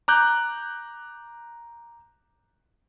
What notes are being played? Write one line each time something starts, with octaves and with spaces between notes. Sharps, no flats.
A#5 D6 F#6 G6